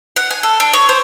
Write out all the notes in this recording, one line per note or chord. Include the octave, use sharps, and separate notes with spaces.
F#5
G#5
A4
D4
C#5
C5